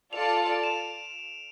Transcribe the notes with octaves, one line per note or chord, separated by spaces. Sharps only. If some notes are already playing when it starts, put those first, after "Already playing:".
F4 A4 D5 A5 F7
D7
E7